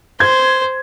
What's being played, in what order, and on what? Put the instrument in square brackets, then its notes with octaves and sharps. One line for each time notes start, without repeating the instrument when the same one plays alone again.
[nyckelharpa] C5 [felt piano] G#6